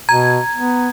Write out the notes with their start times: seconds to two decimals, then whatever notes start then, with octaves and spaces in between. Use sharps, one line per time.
0.09 B2 A#5 G#6
0.57 B3